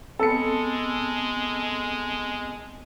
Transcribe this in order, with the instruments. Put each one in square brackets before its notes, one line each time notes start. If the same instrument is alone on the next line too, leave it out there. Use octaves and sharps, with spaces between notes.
[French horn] G#3 [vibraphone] B3 C4 [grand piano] A4 C#7